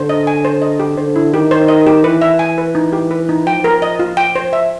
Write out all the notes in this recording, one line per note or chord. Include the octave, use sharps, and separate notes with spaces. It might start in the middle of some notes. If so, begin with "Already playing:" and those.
Already playing: D3 C5
D#5
G#5
C5
D#5
G4
D3 C5
E4
D#3 G4
C5
D#5
G4
E3 B4
E5
G#5
B4
D#4
G4
B4
D#4
F3 G5
A#4
D#5
F4
G5
C5
E5